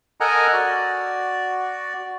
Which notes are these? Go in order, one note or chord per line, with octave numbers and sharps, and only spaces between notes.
A4 A#4 D#5 F#5 G#5 A#5
F#4 D5